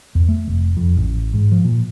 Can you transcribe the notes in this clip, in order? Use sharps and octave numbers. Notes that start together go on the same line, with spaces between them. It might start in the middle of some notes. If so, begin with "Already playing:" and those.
E2
A3
F1
F2
A1
G#2
F3
A#2